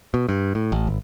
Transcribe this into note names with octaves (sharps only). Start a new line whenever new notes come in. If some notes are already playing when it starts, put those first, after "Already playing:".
B2
G2
A2
A1
G#1